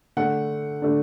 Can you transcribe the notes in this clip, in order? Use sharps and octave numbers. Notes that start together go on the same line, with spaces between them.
D3 A3 D4 F#5
D3 A3 D4